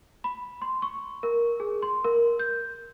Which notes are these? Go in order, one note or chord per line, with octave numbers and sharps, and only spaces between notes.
B5
C6
C#6
A#4
G#4
C6
A#4
G6